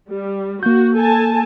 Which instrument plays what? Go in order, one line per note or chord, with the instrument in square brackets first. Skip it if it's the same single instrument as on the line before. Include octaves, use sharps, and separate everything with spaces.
[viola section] G3
[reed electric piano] A#3 G6 [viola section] F#4
[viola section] A4 G#5 A5